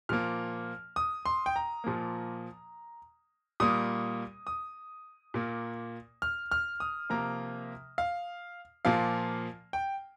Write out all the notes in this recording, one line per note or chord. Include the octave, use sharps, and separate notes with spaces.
A#2 F3 A#3 F6
D#6
C6
G5
A#5
A#2 F3 A#3
A#2 G3 A#3 D#6
D#6
A#2 A#3
F6
F6
D#6
C3 F3 A#3 A#5
F5
A#2 F3 A#3 F5
G5